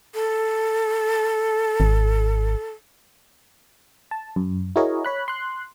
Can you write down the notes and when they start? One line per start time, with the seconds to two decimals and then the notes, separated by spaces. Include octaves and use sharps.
0.14 A4
1.80 G#1
4.11 A5
4.36 F#2
4.76 E4 F#4 G#4 A#4 C#5 D#5
5.05 C#5 B5 F#6
5.28 C6 F#6